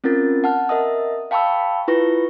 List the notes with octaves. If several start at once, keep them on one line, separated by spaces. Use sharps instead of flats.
C4 C#4 F4 A#4 A6
F#5 A5 F6
A#4 D#5 E5 D#6
F5 G5 A5 B5 C#6 E6
E4 F4 B4 C#6 A#6